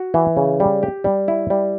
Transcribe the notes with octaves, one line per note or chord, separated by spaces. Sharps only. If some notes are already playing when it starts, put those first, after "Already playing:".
Already playing: F#4
E3
C#3
G3
G4
G3
E4
G3